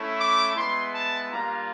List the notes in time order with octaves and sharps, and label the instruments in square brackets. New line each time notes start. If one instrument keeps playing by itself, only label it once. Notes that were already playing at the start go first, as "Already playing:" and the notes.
Already playing: [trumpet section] A3 C#4 E4
D6
G#3 B3 E4 C6
A5
G3 A#3 D4 F4 A#5